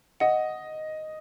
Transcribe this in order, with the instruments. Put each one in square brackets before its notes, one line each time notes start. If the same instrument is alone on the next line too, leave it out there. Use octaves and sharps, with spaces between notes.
[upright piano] D#5 [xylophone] F#5